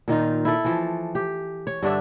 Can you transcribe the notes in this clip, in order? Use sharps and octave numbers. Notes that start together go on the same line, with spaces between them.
A#2 D#3 D#4 F4
E4 A4
E3 F3
G4
C#5
G2 D3 D4 E5